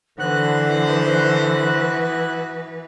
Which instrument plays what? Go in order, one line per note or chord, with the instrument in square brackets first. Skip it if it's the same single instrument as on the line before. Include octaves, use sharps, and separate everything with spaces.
[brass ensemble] D3 C5 [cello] E3 B4 [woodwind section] B3 E4 F#4 [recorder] F#6